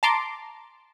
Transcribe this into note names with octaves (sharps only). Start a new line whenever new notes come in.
A5 A#5 C6 D6